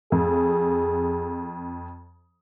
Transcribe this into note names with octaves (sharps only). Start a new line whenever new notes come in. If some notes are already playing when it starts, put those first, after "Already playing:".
F2 G#4